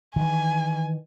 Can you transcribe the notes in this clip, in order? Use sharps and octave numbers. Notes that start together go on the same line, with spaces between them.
D#3 E3 G#5